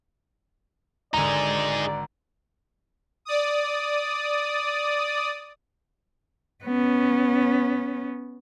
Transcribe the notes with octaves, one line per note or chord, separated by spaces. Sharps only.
G#1 D3 D#4 G#4 D5 A#5
D5 D#6
B3 C#4